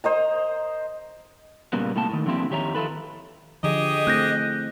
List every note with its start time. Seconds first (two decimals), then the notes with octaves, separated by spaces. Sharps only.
0.04 C5 D#5 A#5
1.73 A#2 C#3 G3 A#3 B3
1.96 A2 C3 A#3 G5 A5
2.09 A2 D#3
2.26 D3 F3 A#3 C4 E4 G4
2.50 F2 D#3 G4 C#5 E5 A#5
2.75 D#3 E4 F4 A4 B4
3.63 D3 F3 G4 G#4 D#5
4.07 A3 C4 E4 F#6 G6 A#6